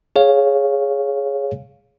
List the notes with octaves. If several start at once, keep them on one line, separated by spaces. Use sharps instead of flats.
G#4 C#5 F5